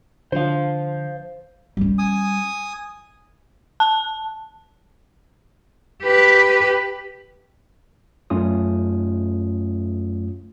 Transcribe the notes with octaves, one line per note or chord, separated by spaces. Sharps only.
D3 F3 C5 F5
G3 C#4
G#5 D#6
A5
G4 B4
F#2 A3 C#4 F4 D#6